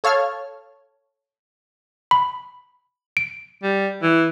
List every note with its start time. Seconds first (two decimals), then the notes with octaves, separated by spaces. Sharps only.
0.04 A4 C#5 F5 A5 F6 G#6
2.11 B5
3.17 D7
3.63 G3
4.03 E3